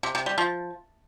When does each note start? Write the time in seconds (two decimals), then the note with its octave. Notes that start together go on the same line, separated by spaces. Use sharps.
0.03 C3
0.15 C3
0.26 G3
0.38 F3